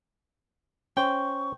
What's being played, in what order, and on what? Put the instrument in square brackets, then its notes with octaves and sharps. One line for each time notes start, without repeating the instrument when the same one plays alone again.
[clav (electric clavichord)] C#4 C5 [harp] G5 [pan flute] C#6